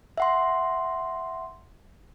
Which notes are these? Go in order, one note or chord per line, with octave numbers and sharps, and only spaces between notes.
E5 F#5 C6